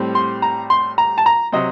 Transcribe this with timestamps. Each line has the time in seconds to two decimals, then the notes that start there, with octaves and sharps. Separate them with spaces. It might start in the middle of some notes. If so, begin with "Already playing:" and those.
Already playing: A2 G3 C4
0.15 C6
0.42 A#5
0.70 C6
0.98 A#5
1.18 A5
1.26 A#5
1.52 C3 F#3 C4 D#5